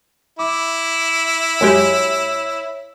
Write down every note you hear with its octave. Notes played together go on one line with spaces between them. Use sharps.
E4 D6
F#2 G#3 G4 C#5